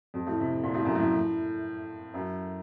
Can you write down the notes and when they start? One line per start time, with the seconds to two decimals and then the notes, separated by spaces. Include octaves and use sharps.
0.14 F2
0.27 A2
0.40 C3
0.64 A#2
0.74 A2
0.85 F#2
0.95 A2
2.14 F#2